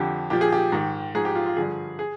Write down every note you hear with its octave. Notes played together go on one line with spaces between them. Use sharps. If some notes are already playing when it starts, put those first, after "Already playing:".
Already playing: F2 D3 F3 G4
A#2 F3 G4
G#4
G4
G#2 D#3
G#2 F3 G#4
G4
F4
F4
G2 D3 F3 G#4
G#4